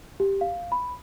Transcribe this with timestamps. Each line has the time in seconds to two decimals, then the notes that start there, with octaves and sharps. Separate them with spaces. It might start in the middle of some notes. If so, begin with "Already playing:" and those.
0.20 G4
0.41 F5
0.72 B5